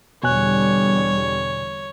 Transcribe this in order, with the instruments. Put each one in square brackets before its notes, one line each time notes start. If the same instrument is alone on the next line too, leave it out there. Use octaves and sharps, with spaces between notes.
[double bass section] E2 D3 G3 [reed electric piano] B2 G#5 F#6 [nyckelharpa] C#5